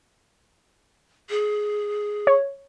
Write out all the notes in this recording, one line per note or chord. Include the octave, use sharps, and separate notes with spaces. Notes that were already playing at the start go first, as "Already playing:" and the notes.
G#4
C#5